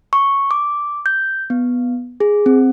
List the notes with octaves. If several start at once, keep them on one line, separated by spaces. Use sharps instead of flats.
C#6
D6
G6
B3
G#4
C4